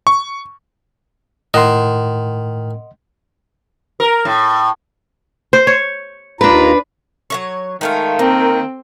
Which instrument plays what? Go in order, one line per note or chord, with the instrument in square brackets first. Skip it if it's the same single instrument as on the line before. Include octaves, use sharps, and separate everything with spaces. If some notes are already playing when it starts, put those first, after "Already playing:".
[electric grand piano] C#6
[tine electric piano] A2 [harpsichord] D#3 [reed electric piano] D#5 F#5 C6
[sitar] A#4
A2
[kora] C5
C#5
[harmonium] D#2 F4 A#5 [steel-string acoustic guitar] D4 B4
[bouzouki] F#3 G#3 C#5
[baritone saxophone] D#3 [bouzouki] G#3 A3 F5
[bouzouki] A#3 [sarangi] C4 [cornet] A#4